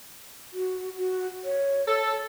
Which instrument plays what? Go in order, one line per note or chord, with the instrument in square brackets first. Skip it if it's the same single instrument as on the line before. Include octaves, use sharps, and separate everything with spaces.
[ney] F#4
F#4
C#5
[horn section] A4